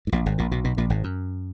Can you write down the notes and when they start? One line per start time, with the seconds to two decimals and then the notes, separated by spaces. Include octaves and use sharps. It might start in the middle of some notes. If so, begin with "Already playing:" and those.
0.07 G#2
0.12 A#1 A#2
0.26 G#1 G#2
0.38 A#1 A#2
0.51 B1 B2
0.64 B1 B2
0.77 A#1 A#2
0.90 G#1 G#2
1.04 F#2